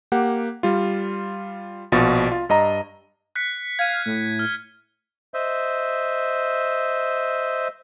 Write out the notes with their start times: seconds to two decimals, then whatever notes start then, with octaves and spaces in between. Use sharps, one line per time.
0.12 A#3 G4 F#5
0.63 G3 F4
1.92 A#1 B2 F4 A6
2.32 F4
2.49 G2 D#5 A#5
3.36 F#6 B6 C#7
3.79 F5 G#6 D#7
4.06 A2
4.39 F6
5.34 C5 D#5 E5